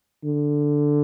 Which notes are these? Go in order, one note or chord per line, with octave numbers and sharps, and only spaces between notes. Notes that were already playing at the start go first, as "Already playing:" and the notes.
D3